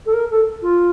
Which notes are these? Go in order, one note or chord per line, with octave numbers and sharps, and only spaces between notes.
A4
A#4
A4
F4